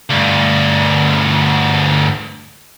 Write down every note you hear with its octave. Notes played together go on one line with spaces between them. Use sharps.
D2 G2